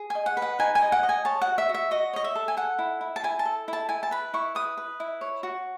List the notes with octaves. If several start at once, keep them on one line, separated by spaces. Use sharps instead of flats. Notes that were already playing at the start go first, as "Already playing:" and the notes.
Already playing: G#4
D#5 G#5
F#5
B4
F#5
D#4 G#5
G#5
D#5
F#5
D#5
G#5
C#5 A5
F#5
F#4
E5
F#4
E5
F#4 D#5
C#5 D#5
E5
A4
G#5
A4 F#5
E4
E4
A5
E4 G#5
A5
A4
E4 A5
E4 G#5
A5
B4 B5
E4 C#6
B4 D#6
B4
E4
C#5
F#4